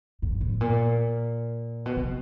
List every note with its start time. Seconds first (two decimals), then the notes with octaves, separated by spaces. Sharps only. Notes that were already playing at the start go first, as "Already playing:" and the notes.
0.22 G2
0.41 A2
0.61 A#2
1.86 B2
1.97 C3